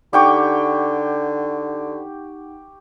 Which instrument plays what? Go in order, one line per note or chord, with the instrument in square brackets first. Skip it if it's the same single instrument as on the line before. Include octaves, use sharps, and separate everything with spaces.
[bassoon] D3 [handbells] D#4 F#5 D6 [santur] G4 G5 C#6